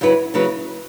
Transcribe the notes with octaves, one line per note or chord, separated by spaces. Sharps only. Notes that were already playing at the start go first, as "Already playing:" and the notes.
F#2 C#3 F#3 E4 B4
C#3 F#3 E4 B4